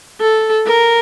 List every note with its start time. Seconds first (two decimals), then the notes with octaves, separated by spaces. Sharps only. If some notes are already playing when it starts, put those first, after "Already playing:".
0.20 A4
0.67 A#4